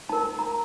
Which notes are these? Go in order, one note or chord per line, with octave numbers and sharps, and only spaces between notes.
D#4 A#4 A5
A#5